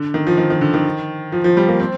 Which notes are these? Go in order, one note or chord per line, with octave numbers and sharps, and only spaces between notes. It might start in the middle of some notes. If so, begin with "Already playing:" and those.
Already playing: D3
D#3
F3
D#3
D#3
D3
D#3
F3
F3
G3
A#3
C4